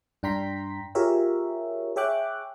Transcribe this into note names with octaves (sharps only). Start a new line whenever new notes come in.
G2 D4 G5 A#5 C6 B6
F4 G4 G#4 A#4 C#5 E5
G#4 C#5 E5 G5 D6 F#6